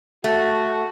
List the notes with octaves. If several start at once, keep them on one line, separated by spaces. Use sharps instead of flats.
A3 F#4